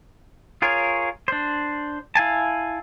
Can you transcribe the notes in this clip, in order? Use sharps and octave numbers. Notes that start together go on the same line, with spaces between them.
F4 G#4 A#4 C#5
D4 C5
E4 F5 G#5 A5